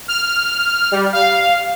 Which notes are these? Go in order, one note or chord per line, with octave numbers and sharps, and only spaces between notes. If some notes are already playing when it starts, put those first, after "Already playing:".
F6
G3
F5